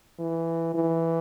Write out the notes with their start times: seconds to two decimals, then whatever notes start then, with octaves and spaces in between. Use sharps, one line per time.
0.19 E3
0.74 E3